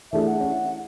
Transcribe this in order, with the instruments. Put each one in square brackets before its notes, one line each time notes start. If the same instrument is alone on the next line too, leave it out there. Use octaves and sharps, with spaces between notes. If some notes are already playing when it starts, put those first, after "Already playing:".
[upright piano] E3 A3 D4 G#4 [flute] E5
[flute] F#5
[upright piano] C#4 E4